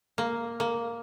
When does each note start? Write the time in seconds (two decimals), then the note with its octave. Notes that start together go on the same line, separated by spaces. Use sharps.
0.18 A#3
0.60 A#3